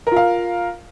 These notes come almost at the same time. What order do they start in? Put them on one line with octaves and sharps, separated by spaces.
A#4 F4 F5